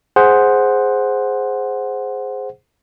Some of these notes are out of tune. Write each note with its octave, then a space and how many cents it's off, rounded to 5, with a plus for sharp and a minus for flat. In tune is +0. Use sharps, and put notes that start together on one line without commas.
G#4 +0 C5 +0 F#5 +0